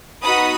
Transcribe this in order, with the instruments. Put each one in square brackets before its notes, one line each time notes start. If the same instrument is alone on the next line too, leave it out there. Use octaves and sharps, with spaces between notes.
[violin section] B3 D#4 F#4 B5 D#6